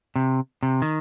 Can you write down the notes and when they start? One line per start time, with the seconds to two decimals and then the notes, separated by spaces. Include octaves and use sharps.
0.16 C3
0.63 C3
0.82 D#3